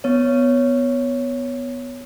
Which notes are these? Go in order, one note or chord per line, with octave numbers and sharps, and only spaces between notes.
B3 C#5